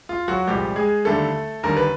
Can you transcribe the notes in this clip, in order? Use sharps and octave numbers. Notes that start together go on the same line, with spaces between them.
F4
F#3 F#4
C2 A#2 F3 G3 G#3 G4
G#3 G#4
D#2 D3 G3 A3 A4
D#2 D3 G3 A#4
B4